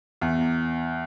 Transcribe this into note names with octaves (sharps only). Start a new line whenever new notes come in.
E2